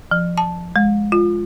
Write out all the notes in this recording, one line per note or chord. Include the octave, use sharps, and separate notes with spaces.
F3
A5
G#3
F4